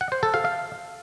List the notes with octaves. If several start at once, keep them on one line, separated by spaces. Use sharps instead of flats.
F#5
C5
A4
F5
F5